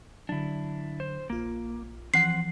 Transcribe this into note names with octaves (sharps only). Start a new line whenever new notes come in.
D3 F#3 D4 E4
C5
A#1 A#3 F4
E3 F3 C4 F#5 C7